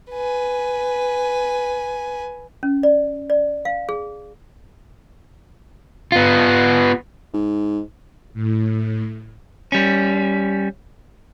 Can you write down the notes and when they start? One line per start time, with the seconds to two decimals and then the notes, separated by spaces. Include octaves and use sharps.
0.11 B4 G#5
2.63 C#4
2.83 D5
3.30 D5
3.65 F5
3.89 G#4
6.12 B3 F4
7.34 G#2
8.34 A2
9.72 G3 C#4